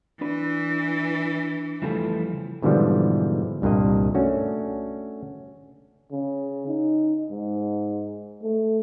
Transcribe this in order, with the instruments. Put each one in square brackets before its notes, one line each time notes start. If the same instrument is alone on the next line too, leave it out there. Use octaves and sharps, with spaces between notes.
[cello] E3 [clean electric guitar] D4 B4
[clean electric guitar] F2 C#3 G3 [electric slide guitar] E3 F3 A3
[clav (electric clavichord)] G#2 B2 D3 E3 F3 G3
C2 G2 A#2 A#3 D#5
A3 C#4 D4 F#4 A4
[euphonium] C#3
D#4
G#2
A3